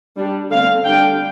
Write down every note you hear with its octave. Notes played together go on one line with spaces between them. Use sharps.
G3 D4
D3 A3 C4 F5
D3 G3 D4 G5